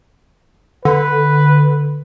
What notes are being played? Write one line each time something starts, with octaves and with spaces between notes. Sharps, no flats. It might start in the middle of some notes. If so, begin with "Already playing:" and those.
D3 B4